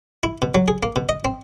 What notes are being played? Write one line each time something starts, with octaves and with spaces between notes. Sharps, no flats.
E4
B2
F#3
G#4
A#3
B2
D#5
C4